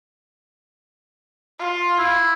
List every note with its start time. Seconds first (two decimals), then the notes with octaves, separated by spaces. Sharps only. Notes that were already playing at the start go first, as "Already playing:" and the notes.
1.59 F4
1.98 E4